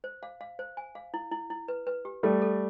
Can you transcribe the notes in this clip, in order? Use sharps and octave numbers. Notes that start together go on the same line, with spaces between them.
C5
F5
F5
C5
G#5
F5
E4
E4
E4
B4
B4
G4
G3 A3 A4
A4